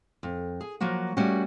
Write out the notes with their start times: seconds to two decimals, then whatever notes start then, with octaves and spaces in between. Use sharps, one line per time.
0.23 F2
0.61 G#4
0.81 F3 F#3 A#3 F#4
1.17 G3 A3 A#3 C#4 F#4